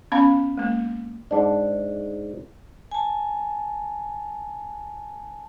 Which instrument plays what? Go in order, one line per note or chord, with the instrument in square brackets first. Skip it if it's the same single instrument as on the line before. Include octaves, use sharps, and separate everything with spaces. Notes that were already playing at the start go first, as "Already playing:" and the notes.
[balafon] B3 C#4 F5 B5
G#3 A#3
[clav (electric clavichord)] G#2 D4
[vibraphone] G#5 A5